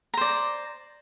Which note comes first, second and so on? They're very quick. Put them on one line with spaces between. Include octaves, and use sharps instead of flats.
A#5 C5 D5